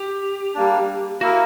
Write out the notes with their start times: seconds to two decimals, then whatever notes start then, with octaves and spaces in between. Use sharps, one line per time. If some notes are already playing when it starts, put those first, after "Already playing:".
Already playing: G4
0.55 G3 A#3 D4
1.21 A#3 E4 F#4 A#4